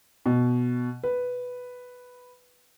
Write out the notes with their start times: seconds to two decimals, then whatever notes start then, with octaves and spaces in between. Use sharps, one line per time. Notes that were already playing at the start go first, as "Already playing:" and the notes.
0.26 B2
1.04 B4